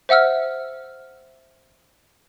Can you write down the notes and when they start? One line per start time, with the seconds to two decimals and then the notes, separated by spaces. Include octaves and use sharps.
0.09 C5 E5 F#5 E6 F6